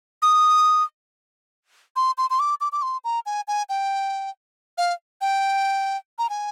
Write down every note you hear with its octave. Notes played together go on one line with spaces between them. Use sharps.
D#6
C6
C6
C6
D6
D6
D6
C6
A#5
G#5
G#5
G5
F5
G5
A#5
G#5